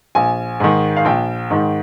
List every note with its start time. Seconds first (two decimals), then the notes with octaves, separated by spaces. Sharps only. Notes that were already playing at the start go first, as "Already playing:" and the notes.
0.15 A#1 G#5
0.60 G#2 D#3
0.97 F5
1.05 A#1 G5
1.50 G#2 D#3